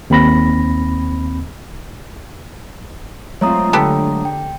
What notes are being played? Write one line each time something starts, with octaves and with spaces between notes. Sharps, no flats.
D#2 C4 B5 A#6
F#3 G#3 A3 C4 F4 C#5 A#5 D#6
D3 B3 G4 A4
G5